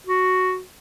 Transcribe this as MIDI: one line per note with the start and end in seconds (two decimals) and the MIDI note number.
0.07 0.60 66